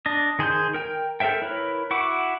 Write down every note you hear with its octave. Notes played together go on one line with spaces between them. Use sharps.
D4 D#5
D#3 G#4 C5 G#5 G6
A#4 G5
A4 A#4 C5 E5 G5
E4 A#4 B4 C#5
E4 F#4 F#5 C#6 D6